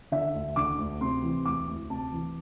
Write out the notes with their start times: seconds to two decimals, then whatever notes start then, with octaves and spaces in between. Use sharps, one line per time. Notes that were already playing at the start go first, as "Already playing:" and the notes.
0.12 D3 E5
0.34 D2
0.56 D3 D6
0.78 D2
1.01 C3 C6
1.22 E3
1.45 D2 D6
1.68 D2
1.90 C3 A5
2.12 E3